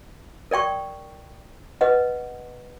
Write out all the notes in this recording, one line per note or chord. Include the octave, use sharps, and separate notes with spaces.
A#4 D5 G5 C#6
B4 D#5 F#5